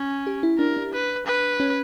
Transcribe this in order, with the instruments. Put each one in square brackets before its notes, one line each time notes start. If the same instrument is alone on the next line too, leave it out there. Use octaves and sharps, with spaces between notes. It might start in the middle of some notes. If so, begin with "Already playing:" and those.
Already playing: [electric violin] C#4
[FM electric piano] G4
E4
[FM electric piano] D4 [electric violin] A#4
[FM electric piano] D4
[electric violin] B4
B4
[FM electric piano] C#4